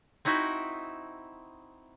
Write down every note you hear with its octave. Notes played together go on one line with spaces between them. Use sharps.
C4 D#4 E4 F#4 E5